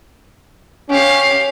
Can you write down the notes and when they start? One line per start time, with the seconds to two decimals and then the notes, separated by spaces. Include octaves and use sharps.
0.90 C#4 G4 F5